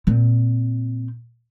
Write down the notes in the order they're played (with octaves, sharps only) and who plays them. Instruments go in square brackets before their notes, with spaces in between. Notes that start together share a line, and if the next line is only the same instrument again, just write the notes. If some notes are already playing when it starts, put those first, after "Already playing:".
[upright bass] A#2 C4